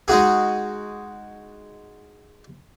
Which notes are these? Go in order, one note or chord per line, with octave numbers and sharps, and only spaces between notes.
G#3 D#4 F#4 G#4